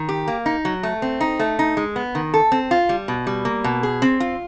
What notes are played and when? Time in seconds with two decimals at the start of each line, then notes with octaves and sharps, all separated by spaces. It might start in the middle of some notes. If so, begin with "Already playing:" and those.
Already playing: D#3
0.09 G4
0.28 A#3
0.46 D#4
0.65 F#3
0.83 A3
1.02 C4
1.21 D#4
1.39 A3
1.59 D#4
1.77 G#3
1.96 B3
2.15 D#3
2.34 A4
2.52 C4
2.71 F4
2.89 G3
3.08 B2
3.27 G3
3.45 A#3
3.64 B2
3.83 G#4
4.02 C4
4.20 F4